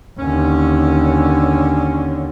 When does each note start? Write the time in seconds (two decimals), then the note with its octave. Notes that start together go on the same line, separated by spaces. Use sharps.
0.19 D#2 D3 C#4